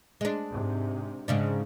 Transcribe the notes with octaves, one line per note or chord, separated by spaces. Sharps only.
G#3 D4
G#2 C3
G#2 C#3 D4